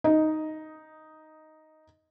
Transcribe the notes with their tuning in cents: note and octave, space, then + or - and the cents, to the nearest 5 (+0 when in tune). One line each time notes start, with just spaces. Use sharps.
D#4 +0 D#5 +5